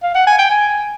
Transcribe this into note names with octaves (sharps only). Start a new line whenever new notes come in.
F5
F#5
G#5
G5
G#5